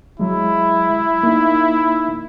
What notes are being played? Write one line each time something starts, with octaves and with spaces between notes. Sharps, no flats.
F#3 G#3 E4
A#3 D#4